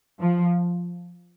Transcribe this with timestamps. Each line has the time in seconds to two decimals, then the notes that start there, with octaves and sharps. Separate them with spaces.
0.19 F3